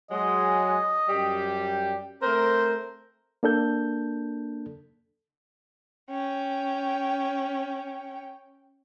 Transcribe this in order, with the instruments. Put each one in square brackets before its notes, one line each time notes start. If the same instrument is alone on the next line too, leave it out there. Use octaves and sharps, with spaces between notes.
[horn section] F#3 G#3 [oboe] D#5
[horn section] F#2 G3 G4
[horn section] A3 C4 A#4 [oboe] C5
[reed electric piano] A#3 D4 A4 G6
[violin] C#4 G5